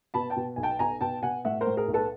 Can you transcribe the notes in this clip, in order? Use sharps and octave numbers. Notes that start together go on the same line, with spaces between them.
B2 A5 B5
G5 A5
B2
B1 G#5
G5 A5
B2 G#5 A#5
B2 G5 A5
B2 F#5 G#5
A2 E5 F#5
A#4 C5
A2
G#4 A#4
B1
A4 B4